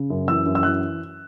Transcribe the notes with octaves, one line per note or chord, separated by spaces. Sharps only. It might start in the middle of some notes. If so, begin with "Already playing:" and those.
Already playing: C#3
F#2
E3 E6
F#2
E6
E3 F#6